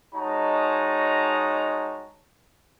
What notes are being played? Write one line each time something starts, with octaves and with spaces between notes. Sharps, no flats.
G#3 D#4 F#4 C#5 A5 A#5